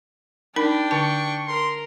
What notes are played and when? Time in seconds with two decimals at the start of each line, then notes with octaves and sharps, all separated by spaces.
0.56 D4 D#4 A#4 G5 B5
0.91 D3 A5 C#6
1.47 A#4 C6